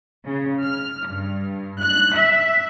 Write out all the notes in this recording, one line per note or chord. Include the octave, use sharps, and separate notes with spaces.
C#3
F6
G2
F#6
E5